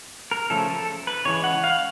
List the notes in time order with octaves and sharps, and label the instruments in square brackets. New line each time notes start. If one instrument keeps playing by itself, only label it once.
[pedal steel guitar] A#4
C#3 F3 A3 C#4 A4
A4
B4
C#3 E3 G#3 C#5
F#5
F5